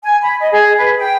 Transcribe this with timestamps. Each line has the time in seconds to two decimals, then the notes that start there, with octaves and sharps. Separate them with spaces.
0.02 G#5
0.21 B5
0.40 D#5
0.52 G#4
0.78 B4
0.99 G5